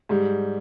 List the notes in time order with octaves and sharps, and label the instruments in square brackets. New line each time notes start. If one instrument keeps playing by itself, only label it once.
[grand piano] G#2 G3